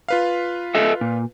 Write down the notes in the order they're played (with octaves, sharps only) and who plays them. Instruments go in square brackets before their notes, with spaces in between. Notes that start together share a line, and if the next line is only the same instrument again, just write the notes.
[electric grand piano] F4 B4 F5
[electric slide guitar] A4 D#5 E5
A#2